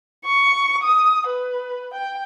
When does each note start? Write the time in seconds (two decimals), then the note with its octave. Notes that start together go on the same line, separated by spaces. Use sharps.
0.25 C#6
0.83 D#6
1.27 B4
1.93 G5